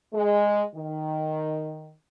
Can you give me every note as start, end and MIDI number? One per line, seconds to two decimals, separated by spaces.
0.14 0.64 56
0.75 1.91 51